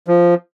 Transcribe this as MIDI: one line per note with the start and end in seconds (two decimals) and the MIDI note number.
0.07 0.35 53